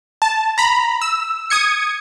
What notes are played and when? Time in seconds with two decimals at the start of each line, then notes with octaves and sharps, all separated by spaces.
0.22 A5
0.58 A#5 B5
1.02 E6
1.50 D#6 G#6 C#7